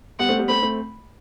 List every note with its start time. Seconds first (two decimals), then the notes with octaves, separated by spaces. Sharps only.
0.19 G3 B3 F#5
0.29 A3 C4
0.39 G3 B3
0.48 A3 C4 B5
0.62 A3 C4